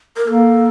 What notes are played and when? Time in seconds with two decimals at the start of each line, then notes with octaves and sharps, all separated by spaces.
0.17 A#4
0.28 A#3 A4